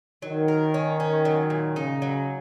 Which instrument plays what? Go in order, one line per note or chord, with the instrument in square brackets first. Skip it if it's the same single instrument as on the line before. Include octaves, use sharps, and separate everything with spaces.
[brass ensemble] D#3 [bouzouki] F#3
[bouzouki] A#4
C#4
C#4
F#3
A#2
[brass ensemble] C#3 [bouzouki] D#4
[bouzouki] F#3